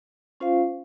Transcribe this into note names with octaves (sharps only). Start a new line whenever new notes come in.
C#4 F4 C5 F5